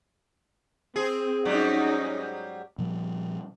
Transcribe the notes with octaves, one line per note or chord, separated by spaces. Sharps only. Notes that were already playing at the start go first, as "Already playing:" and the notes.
C4 G#4
G#2 F#3 G3 C#4 D#4
A#2 F3 G3